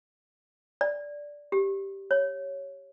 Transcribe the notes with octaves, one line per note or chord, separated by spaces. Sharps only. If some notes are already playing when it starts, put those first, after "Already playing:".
D5
G4
C#5